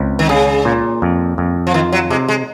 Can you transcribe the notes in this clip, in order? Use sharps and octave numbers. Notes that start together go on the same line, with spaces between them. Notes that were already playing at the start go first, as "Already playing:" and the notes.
Already playing: C#2 C4
D#3
C#3 G#4
A#2
F2
F2
F3
D#3 F4
F#3
C3 G#3
G#3